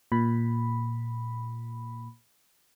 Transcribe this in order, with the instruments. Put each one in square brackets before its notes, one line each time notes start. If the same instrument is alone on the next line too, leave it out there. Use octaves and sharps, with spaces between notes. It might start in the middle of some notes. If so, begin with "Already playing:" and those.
[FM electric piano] A#2 B5